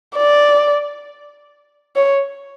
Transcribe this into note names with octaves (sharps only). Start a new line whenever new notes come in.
D5
C#5